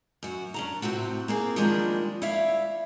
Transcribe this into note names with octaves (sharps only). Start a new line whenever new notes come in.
F#2 F#4
C#4 D4 A#5
A2 C3 C4 F#4
A#3 C4 G#4
D#3 F3 G3 G#3 A#3 D4
E4 C#5 D5 E5 F5